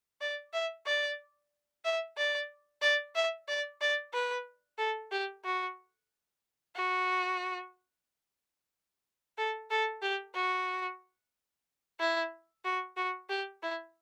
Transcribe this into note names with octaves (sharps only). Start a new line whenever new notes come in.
D5
E5
D5
E5
D5
D5
E5
D5
D5
B4
A4
G4
F#4
F#4
A4
A4
G4
F#4
E4
F#4
F#4
G4
E4